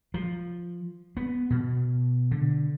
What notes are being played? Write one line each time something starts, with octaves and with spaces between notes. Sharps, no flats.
F3
B3
B2
D3